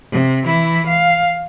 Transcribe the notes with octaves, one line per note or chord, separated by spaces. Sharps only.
C3
E3 E4
F5